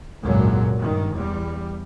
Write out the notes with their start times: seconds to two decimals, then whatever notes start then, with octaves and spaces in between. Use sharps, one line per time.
0.21 G#1 C#2 F#2 A#2 D3 F#3
0.77 G2 D#3
1.13 E2 G3